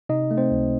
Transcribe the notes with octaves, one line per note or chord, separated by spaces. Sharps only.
C3 D#4 D#5
A3
C4 C5
C#2